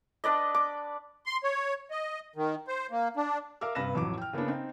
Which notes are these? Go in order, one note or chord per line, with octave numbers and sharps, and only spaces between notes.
D4 B4 D5 D#5
D6
C6
C#5
D#5
D#3
C5
A#3
D4
A#4 E5 F5 D6 E6
G2 C3 B4 F5 A#6 E7
A1 F2 F#3 D6
G5 F6
C#3 A#3 B3 C#4 D4
C4 D#4